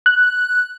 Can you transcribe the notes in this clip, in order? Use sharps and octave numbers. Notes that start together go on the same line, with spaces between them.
F#6